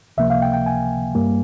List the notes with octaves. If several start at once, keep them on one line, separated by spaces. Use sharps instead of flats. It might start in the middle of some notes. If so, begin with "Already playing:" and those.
C#2 C3 F3 A#3 E5
F5
G5
G5
G#5
G2 G3 A#3